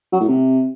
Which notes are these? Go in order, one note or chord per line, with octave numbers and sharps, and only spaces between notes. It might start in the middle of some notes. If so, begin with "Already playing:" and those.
F#3
A2
C3